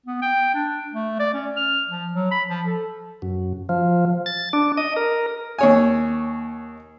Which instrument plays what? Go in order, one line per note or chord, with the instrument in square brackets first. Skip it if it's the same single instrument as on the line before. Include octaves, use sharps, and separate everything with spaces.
[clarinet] B3
G5
D4
A3
D5
C#4
F6
F3
F#3
B5
F3
A4
[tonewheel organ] F#2
F3
A6
D4
D#5
A#4
[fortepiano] D#2 C#5 G#5